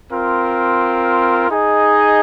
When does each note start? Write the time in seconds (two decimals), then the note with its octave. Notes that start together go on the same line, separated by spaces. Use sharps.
0.10 C4 F4 A#4
1.48 D#4 G#4 D#5